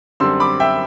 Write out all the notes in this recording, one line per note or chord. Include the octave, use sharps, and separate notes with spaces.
F#2 D3 G3 C4 C6 E6
B5 D6
E5 G5